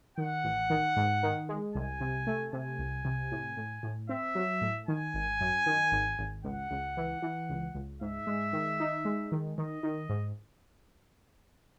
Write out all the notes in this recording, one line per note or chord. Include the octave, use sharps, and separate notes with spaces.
D#3 F#5
A1
D#3
G#2
D#3
G#3
C2 G#5
C3
A3
C3 G#5
C2
C3
A2
A2
A2
C4 E5
F#3
A2
D#3 G#5
G#1
F#2
D#3
G#1
G#1
C#2 F#5
C#2
E3
E3
C#2
C#2
G#2 E5
G#3
D#3
D#4
G#3
D#3
D#3 D#5
D#3
G#2